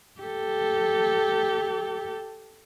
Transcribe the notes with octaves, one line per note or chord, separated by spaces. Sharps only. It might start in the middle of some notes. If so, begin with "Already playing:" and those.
G4 A4